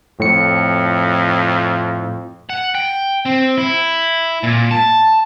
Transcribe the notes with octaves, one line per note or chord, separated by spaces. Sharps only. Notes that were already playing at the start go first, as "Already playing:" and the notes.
F2 A2 C#7
F#5
G5
C4
E4
A#2
A5